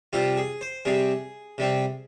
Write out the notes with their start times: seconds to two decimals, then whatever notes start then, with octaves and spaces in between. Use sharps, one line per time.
0.13 C3 G3 C4 F4
0.37 G#4
0.61 C5
0.85 C3 G3 C4 G#4
1.58 C3 G3 C4